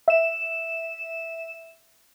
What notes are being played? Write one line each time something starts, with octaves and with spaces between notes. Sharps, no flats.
E5 E7